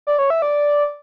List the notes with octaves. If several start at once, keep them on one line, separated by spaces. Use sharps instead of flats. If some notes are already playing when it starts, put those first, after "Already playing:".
D5
C#5
E5
D5